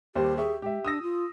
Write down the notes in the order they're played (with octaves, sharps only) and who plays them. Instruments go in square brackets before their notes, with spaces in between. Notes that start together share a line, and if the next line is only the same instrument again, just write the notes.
[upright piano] D#2 G3 C5 [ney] G4
[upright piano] G4 E5 C#6 [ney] G#4
[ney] G#3 [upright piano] G4 E5
[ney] D4 [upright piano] D#6 E6 A#6
[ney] F4